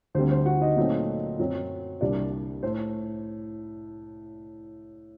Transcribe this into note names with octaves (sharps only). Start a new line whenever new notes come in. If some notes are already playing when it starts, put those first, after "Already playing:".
D2 D3 G3 C4 C5
C5
F#4 F#5
D#4 D#5
A#2 F#3 A3 C4 D#4 D#5
F#2 F#3 C4
C2 C3 G3 A#3 D4 D5
A2 C5